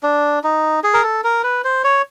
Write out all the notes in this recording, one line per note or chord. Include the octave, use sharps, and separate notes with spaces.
D4
D#4
G#4
A#4
A4
A#4
B4
C5
C#5